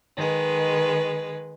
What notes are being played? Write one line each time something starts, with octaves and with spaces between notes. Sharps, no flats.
D#3 G#3 B4